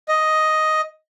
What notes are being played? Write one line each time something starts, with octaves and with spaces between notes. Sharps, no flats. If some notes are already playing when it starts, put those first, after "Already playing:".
D#5